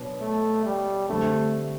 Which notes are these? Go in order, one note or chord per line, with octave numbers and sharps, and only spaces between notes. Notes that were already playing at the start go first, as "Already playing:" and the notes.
Already playing: B2 F#3 B3 D4
A3
G3
D3 G3 A3 C4